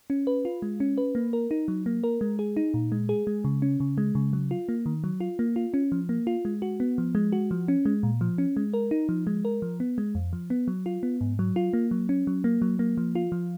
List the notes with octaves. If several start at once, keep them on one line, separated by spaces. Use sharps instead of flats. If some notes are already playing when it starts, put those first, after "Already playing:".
C#4
B4
F4
G#3
C#4
B4
A#3
A#4
D#4
F#3
A#3
A#4
G#3
G#4
D#4
A#2
G#3
G#4
G#3
C#3
C#4
C#3
G#3
C#3
F#3
F4
A#3
D#3
F#3
F4
A#3
F4
C#4
F3
A#3
F4
G#3
F#4
B3
F3
G#3
F#4
F3
C#4
G#3
A#2
F3
C#4
G#3
A#4
D#4
F3
G#3
A#4
F3
B3
G#3
F2
F3
B3
F#3
F4
B3
G#2
F#3
F4
A#3
F#3
C#4
F#3
A#3
F#3
A#3
F3
F4
F3